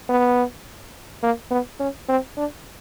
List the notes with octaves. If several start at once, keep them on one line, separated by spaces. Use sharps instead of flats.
B3
A#3
B3
C#4
C4
D4